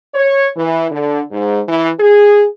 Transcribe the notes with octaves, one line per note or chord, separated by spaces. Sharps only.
C#5
E3
D3
G#2
E3
G#4